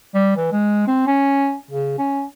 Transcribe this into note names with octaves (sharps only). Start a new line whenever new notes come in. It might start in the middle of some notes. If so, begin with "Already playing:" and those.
G3
E3
G#3
C4
C#4
C#3
C#4